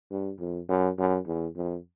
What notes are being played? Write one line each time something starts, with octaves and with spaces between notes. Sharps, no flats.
G2
F2
F#2
F#2
E2
F2